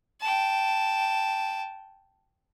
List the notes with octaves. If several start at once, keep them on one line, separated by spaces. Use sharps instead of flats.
G5 A5